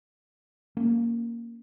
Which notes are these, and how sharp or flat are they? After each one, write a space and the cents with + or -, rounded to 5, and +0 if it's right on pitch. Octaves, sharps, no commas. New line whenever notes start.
A#3 +0 C#4 +0